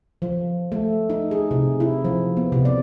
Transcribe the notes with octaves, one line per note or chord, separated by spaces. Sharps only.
F3
A3
D#4
G#4
C3
E4
F3
B3
C3
D5